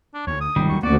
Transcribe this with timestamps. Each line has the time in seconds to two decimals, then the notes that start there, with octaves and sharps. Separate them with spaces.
0.14 D4
0.27 D2 C#5
0.41 D#6
0.56 G#1 C3 D#3 F3 G3
0.69 D2 F#3 C#6
0.83 D2 A#3 C#4 F#4 D5